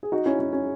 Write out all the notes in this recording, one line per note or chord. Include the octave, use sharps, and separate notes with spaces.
G#4
D#4 F#4
C#4 E4
C#4
C#4